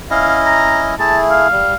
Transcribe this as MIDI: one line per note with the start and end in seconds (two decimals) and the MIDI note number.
0.10 0.95 61
0.10 0.95 64
0.10 0.95 75
0.10 0.38 77
0.45 0.80 82
0.99 1.48 57
0.99 1.48 64
0.99 1.48 68
0.99 1.18 81
1.30 1.76 77
1.52 1.75 55